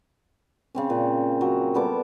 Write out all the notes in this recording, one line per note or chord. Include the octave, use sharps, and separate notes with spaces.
C#3 C4 C#4
A#2
F#3
G3 B3 A4 D6